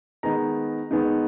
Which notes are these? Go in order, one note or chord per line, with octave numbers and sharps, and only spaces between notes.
D#3 G#3 B3 A#5
D#3 G#3 B3